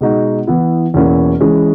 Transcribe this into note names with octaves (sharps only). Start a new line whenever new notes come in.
B2 G#3 D#4 F#4
E3 B3 E4
E2 B2 A#3 C#4 E4
E3 G#3 C#4